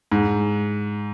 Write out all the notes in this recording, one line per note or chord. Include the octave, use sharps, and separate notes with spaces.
G#2